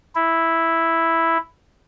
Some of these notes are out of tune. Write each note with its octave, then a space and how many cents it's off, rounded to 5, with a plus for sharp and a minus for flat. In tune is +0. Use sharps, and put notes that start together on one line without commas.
E4 +0